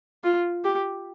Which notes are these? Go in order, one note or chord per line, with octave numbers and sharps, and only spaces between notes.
F4
G4